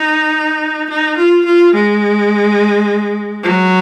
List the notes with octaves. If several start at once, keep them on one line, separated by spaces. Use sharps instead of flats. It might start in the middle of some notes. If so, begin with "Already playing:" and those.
Already playing: D#4
D#4
F4
F4
G#3
F#3